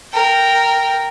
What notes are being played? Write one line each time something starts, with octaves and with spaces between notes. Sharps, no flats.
A#4 G5